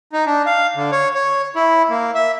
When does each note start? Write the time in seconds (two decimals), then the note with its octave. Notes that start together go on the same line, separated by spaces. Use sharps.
0.13 D#4
0.26 D4
0.46 F5
0.76 D3
0.92 C#5
1.15 C#5
1.56 E4
1.90 A#3
2.15 E5